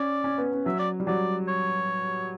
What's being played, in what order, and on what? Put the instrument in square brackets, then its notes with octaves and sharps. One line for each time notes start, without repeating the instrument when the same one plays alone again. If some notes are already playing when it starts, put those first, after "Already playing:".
Already playing: [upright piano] C#4 [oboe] D5
[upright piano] C#4
B3
C#4
[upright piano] F#3 [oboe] E5
[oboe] D5
[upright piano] G3
[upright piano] F#3 [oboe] D5
[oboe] C#5